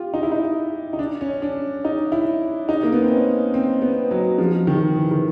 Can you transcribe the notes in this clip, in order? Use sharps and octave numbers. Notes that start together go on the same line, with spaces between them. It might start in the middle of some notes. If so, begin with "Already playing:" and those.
Already playing: F4 G4
D#4
E4
D#4
D#4
D4
C#4
D4
D#4
E4
D#4
A#3
B3
C4
C#4
C4
B3
F#3
F3
D#3
E3
D#3